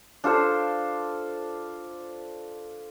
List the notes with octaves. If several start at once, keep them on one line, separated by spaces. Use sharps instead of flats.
D4 F4 A4 C5